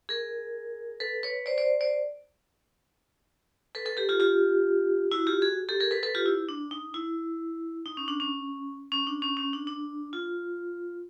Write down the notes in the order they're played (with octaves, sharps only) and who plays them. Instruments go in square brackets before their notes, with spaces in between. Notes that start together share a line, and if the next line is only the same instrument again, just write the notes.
[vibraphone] G#4 A#4
A4 B4
B4 C#5
C5 D5
C5 D5
C5 D5
A4 B4
A4 B4
G4 A4
F4 G4
F4 G4
E4 F#4
F4 G4
F#4 G#4
G4 A4
G#4 A#4
A4 B4
A4 B4
F4 G4
E4
D4
D#4
E4
D#4
C#4
D4
C#4
C#4
D4
C#4
C#4
D4
D4
F4